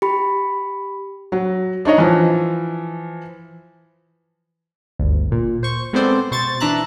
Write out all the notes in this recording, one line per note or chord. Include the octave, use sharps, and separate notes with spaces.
G4 B5
F#3
D4 D#4 C#5 D#5
E3 F3
G1 D2
A#2
C5 C#6
G#3 B3 C4 A4 C5 D5
B2 C5 C#6 A6
E3 D4 E5 A#5 F#6